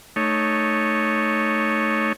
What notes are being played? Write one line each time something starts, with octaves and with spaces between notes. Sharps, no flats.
A3 D#4 C#5